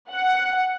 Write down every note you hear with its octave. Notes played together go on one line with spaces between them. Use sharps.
F#5